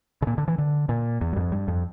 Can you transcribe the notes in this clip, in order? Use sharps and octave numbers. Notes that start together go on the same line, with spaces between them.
C#3
A#2
D3
E3
D3
A#2
E2
G2
F2
G2
F2